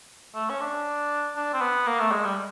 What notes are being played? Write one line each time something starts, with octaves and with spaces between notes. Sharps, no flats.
A3
C#4
D4
D4
C4
B3
A#3
A3
G#3
G3